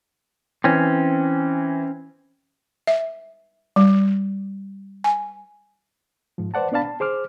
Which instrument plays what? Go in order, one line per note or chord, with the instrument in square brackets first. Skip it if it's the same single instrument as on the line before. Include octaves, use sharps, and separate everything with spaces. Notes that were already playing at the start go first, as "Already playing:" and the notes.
[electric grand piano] E3 [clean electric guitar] C4 C#4
[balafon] E5
G3
G#5
[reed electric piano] G#2 F3
B4 C5 D5 F#5 A5
B3 D4 D5 F5 A5 B5
A5
G#4 C5 D6 F6